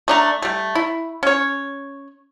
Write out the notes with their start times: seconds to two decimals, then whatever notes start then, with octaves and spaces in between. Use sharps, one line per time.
0.08 A3 D4 A#5
0.42 G3 A3
0.75 E4
1.23 C#4 C#5